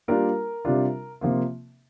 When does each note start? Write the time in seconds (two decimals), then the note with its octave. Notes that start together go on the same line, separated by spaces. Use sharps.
0.08 G3 A#3 D4 F4 A#4
0.65 C3 G3 D4 F4
1.21 C3 F3 A#3 F4